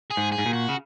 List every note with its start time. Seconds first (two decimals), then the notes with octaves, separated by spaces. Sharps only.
0.10 G#4
0.17 G#2
0.32 G#4
0.38 G#2
0.46 A#2
0.53 F#4
0.69 C#3